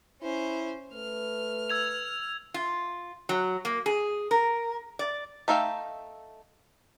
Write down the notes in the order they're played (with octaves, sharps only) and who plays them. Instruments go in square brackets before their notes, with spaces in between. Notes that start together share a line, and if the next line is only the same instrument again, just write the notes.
[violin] C#4 C5 [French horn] E4
[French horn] A3 [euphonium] B4 [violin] F6
[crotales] E6 G#6 F7
[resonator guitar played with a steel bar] F4
F#3
A#3
G#4
A#4
D5
[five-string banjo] A3 D#4 E5 F5 G5